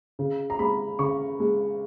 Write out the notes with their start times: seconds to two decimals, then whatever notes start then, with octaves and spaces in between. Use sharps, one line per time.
0.19 C#3
0.50 A#5
0.59 G#3 B5
0.99 C#3 C#6
1.40 G#3